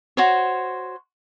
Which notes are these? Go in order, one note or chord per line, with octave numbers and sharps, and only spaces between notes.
F#4 C5 C#5